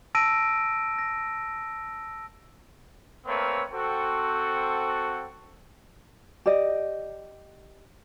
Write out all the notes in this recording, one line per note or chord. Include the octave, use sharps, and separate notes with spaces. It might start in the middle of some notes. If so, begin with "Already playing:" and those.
A5 E6 A#6 D7 D#7
A#6
A3 A#3 C4 A#4 B4 C#5
C4 F#4 A4
G4 D5 D#5